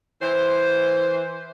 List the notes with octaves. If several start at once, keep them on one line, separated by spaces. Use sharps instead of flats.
E3 C5